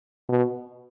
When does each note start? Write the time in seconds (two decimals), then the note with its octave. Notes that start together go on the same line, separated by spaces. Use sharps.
0.29 B2